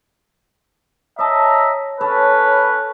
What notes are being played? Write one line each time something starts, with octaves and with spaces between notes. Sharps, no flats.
C#5 D#5 E5 A5 A#5
C#4 A4 B4 C#5